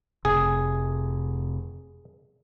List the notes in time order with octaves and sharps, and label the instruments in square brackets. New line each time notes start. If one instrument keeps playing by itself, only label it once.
[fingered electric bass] F1 C3 C4 [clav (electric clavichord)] G#4